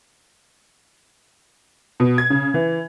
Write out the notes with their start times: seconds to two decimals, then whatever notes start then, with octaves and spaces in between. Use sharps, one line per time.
2.00 B2
2.18 G#6
2.30 C#3
2.54 E3